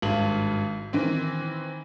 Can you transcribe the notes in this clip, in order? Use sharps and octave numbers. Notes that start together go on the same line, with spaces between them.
G#1 G2 F#7
D#3 E3 C4